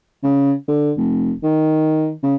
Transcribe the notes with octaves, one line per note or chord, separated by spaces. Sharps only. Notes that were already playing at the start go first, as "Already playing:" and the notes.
C#3
D3
F1
D#3
C#3